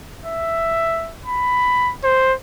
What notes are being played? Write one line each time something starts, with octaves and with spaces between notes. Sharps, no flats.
E5
B5
C5